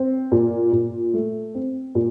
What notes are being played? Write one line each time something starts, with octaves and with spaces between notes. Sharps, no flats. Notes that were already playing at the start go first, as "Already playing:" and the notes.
Already playing: C4
A#2
A#2
A3
C4
A#2